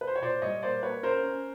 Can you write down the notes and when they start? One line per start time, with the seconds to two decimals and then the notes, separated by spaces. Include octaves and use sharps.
0.01 B4
0.07 C5
0.16 C#5
0.22 A#2 C5 D5
0.42 G3 C#5 D#5
0.62 A#3 C5 D5
0.83 A#3 B4 C#5
1.02 C#4 A#4 C5
1.23 C#4